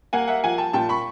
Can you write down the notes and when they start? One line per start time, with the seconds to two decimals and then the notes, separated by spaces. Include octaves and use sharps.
0.13 A#3 F#5 G#5
0.28 E5 F#5
0.44 F3 F#5 G#5
0.58 G5 A5
0.73 A#2 G5 A5
0.89 B5 C#6